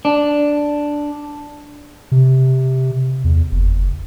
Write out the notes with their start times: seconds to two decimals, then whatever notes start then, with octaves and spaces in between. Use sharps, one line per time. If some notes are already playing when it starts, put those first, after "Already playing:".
0.05 D4
2.12 C3
3.24 E2
3.52 F#1